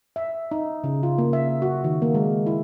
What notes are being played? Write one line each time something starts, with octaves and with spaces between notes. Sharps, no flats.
E5
D#4
C#3
F4
A#3
E5
F#4
D#3
A#3
G#3
E4